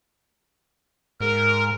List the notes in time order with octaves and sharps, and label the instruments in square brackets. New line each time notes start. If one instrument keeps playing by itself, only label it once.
[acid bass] G#2 [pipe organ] A#4